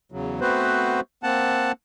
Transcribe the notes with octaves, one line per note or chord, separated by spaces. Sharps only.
E2 C#3 F#3
A3 B3 C4 F#4 B4 C5
A#3 C4 F#5 A5